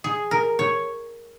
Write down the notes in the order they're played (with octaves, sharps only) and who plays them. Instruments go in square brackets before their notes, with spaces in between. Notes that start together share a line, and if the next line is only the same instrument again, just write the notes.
[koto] G#4
A#4
C#5